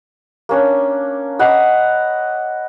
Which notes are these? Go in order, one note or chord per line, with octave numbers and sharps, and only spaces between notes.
A#3 C#4 D4
D#5 F#5 B5 D6